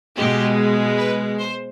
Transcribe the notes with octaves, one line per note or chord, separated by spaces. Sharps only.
B2 G#3 G4
B4
C5